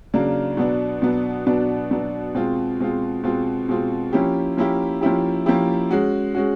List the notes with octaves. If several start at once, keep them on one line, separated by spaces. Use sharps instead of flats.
C#3 F#3 A#3 D4
B2 F#3 B3 D4
B2 F#3 B3 D4
B2 F#3 B3 D4
B2 F#3 B3 D4
B2 G#3 C4 F4
B2 G#3 C4 F4
B2 G#3 C4 F4
B2 G#3 C4 F4
F3 A#3 C#4 E4 G4
F3 A#3 C#4 E4 G4
F3 A#3 C#4 E4 G4
F3 A#3 C#4 E4 G4
G#3 C#4 F#4
G#3 C#4 F#4